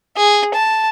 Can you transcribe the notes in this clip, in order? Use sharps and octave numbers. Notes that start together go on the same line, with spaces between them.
G#4
A5